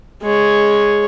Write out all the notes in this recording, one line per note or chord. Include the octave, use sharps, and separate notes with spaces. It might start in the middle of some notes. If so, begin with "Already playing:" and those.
G#3 C#5